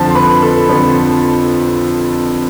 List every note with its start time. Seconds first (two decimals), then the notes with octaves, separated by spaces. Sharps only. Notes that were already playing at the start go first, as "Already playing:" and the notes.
Already playing: F2 D3 F3 A4 A5
0.09 C6
0.15 B4 B5
0.42 A4 A5
0.69 F2 D3 F3